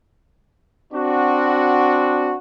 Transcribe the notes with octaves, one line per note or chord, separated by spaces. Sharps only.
C4 D4 F#4